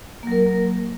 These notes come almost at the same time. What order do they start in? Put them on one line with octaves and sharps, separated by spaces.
A#3 F#3 A#4